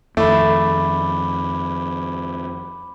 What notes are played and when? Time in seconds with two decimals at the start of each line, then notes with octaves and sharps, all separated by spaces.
0.17 F2 D#3 A3 B5 D6